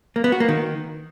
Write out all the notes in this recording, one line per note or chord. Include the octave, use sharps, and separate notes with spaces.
A#3
B3
F#4
A#3
D#3